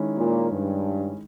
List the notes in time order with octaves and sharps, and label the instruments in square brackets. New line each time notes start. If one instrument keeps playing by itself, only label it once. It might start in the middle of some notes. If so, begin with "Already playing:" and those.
Already playing: [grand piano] D#3 G#3 C#4 E4
[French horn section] A#2
G2